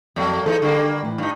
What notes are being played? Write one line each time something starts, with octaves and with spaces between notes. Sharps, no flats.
F2 F#3 A3 A#3
E3 D#4 G#4 A4
D3 G3 A#3
A2 E3
G2 D#4